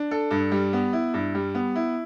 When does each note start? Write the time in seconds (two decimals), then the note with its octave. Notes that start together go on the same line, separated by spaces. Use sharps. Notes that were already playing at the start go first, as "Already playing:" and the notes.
Already playing: D4
0.11 A4
0.31 G2
0.52 G3
0.73 B3
0.93 E4
1.14 G2
1.35 G3
1.55 B3
1.75 E4